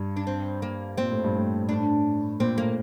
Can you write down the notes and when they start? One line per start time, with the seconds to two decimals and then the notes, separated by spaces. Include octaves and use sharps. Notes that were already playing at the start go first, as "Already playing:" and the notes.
Already playing: G2
0.17 D4
0.27 C4
0.62 A#3
0.98 A#2 C4
1.11 A2
1.24 G2
1.36 A2
1.69 A2 D4
2.40 A#2 C4
2.58 A2 A#3